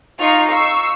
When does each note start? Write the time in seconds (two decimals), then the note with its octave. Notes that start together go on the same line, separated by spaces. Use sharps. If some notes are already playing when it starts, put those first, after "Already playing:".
0.20 D#4 F4 C#6 F6
0.51 C#6 E6 C7